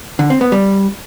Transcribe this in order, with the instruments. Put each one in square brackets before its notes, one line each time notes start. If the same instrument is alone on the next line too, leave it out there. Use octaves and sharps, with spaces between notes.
[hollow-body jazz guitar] D3
C4
B3
G3